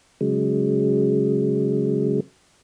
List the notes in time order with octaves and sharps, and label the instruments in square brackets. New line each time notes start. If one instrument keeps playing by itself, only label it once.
[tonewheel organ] C#3 F#3 G#3